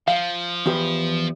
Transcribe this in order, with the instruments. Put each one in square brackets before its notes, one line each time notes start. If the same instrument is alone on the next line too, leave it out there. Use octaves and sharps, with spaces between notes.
[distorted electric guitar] F3 [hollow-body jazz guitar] F5
[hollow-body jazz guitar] E2 G4 B4